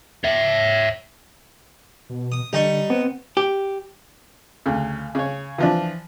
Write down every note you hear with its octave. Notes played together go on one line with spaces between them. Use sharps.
C#5 E5
B2
D#6
D3 G3 D#4 D#5 C#6
B3 C4
G4
D2 C#3
C#3 C#5
E3 F3 D4